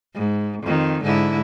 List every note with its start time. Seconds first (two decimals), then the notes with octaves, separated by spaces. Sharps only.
0.14 G#2
0.63 F2 D#3
1.03 G#2 D3 E4